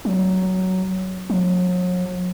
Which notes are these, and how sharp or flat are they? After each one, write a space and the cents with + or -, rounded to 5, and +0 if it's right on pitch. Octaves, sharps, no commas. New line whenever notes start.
F#3 +10
F#3 -40